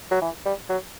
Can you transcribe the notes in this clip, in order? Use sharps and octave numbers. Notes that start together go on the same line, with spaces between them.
F#3
E3
G3
F#3